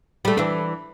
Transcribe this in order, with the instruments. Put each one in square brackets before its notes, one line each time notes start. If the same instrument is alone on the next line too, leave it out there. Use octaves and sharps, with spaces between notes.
[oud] G3 A3
E3 D4